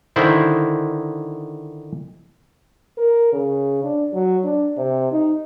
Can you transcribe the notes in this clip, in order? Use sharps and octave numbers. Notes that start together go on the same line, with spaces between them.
D3 D#3 E4 C5
A#4
C#3
D4
F#3
D4
C3
D#4